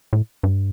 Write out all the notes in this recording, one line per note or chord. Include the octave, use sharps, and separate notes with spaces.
A2
G2